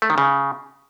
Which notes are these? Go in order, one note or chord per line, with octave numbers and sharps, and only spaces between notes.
A3
D#3
C#3